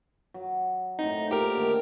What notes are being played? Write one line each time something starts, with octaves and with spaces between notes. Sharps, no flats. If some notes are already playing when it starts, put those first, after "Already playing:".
F#3
A2 C4 D#4
A#2 G4 A#4
D3 D#3 A3